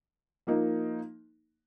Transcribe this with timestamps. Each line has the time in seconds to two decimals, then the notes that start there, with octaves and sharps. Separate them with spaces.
0.47 F3 A#3 D#4